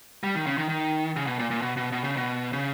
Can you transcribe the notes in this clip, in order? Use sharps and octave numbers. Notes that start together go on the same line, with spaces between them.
G3
D#3
C#3
D#3
D#3
C#3
B2
A#2
A#2
B2
B2
B2
C#3
B2
C#3